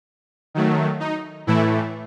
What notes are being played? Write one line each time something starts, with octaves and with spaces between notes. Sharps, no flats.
D#3 F#3 A3
D#4
A2 E3 A3 E4